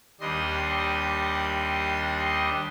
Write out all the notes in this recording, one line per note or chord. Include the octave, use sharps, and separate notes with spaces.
D#2 G3 D4 D#5 C6